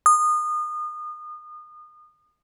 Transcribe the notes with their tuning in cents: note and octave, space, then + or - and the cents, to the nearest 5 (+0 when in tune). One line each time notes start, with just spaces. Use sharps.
D#6 -30